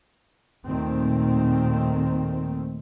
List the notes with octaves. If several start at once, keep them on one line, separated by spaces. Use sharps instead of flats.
D#2 A#2 D#3 A3 C4